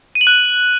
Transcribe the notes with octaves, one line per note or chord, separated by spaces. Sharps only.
D#7
F#7
F#6